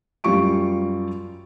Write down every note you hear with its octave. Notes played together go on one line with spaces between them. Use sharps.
F#2 G3 F4 C#6 D7